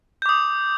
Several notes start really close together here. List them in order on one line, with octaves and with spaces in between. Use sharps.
G6 D6 D#6